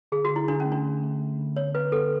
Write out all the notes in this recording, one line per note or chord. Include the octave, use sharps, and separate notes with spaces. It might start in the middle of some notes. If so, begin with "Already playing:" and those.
D3 G#4
F#4
D3
E4
D3 D4
C#4
A3
D4
D3
A3
A3
D3
B3 C#5
B3 B4
B3 A4